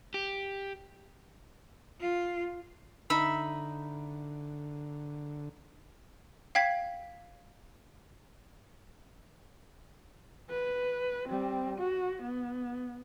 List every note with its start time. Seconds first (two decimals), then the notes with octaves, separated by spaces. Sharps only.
0.14 G4
2.01 F4
3.10 D3 D#4 E5 B5
6.55 F5 G5 G#6 B6
10.50 B4
11.29 G3 C4
11.78 F#4
12.23 B3